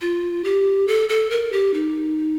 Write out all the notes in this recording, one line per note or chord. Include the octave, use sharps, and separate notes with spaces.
F4
G4
A4
A4
A#4
G4
D#4